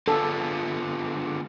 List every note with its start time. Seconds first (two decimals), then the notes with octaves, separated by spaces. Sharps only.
0.08 D3 G#3 B3 D4 F4 A4